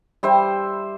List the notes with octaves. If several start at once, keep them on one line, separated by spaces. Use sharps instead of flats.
G3 C5 E5